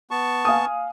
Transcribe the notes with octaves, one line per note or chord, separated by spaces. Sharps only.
B3 A5 C#6
F5 G#5 D#6